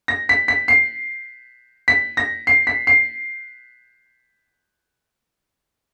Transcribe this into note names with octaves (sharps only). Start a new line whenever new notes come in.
A#6
B6
B6
C7
B6
A#6
C7
B6
C7